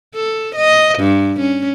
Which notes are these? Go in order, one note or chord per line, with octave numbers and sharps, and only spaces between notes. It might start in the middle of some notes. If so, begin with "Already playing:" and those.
A4
D#5
G2
C#4